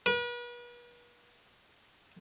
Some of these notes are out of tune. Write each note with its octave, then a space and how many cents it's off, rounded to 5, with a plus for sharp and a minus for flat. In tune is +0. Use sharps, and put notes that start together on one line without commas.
B4 -40